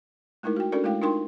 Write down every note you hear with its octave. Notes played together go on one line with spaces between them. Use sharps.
G#3 A3 D#4 E4 A#4
F#4 G5
C#4 D4 F#4 A4 A#4 D5
G#3 A3 E4 F5 G5
D4 D#4 F4 A#4 G5 C6